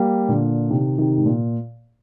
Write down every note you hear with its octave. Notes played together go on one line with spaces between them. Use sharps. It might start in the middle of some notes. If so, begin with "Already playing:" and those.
Already playing: G3 A#3
A#2 D3
C3 D#3
C3 D#3
G#2
A#2